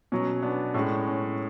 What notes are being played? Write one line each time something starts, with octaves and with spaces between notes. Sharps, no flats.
B2 F#3 C#4
B3 D4
A2 G#3 C#4
C#4